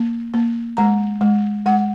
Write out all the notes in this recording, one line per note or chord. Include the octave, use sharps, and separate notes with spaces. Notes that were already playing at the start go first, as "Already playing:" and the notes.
Already playing: A#3
A#3
G#3 A#5
G#3
G#3 F#5